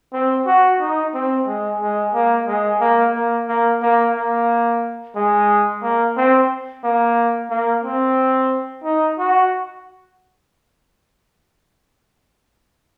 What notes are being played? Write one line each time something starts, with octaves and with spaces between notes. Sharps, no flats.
C4
F#4
D#4
C4
G#3
G#3
A#3
G#3
A#3
A#3
A#3
A#3
A#3
G#3
A#3
C4
A#3
A#3
C4
D#4
F#4